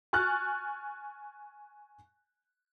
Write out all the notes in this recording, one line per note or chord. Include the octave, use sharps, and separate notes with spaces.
G#5 C#6 F6 F#6 A6